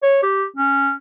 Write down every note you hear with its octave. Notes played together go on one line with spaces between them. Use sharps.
C#5
G4
C#4